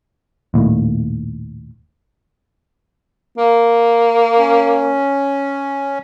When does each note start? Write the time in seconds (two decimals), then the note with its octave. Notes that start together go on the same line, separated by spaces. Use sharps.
0.54 A#1 D#2 A2
3.38 A#3
4.38 C#4